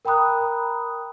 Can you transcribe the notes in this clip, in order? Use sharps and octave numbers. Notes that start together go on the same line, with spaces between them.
A#4 G5 A#5 B5 D#6 F#6